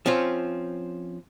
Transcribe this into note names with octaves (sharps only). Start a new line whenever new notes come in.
F3 C4 C#4 F4